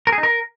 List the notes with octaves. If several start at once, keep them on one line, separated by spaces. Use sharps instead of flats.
A#4
G#4
D#4
A#4